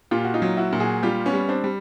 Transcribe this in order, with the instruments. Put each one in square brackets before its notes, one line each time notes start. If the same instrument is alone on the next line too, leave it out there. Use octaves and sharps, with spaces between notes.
[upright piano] A#2 F4 G4
F#4
D#4 F4
F#3
E4 F#4
A#2
F#4 G#4
G3 F4 G4
B3 C#4
G3
C4 D4
G3